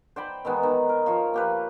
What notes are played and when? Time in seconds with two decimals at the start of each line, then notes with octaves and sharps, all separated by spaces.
0.16 C5 D5 G5 B5
0.45 D#3 E3 G#3 B3
0.63 D#3
0.89 A#4
1.06 F3 F4 C#5
1.34 A#3 G4 B4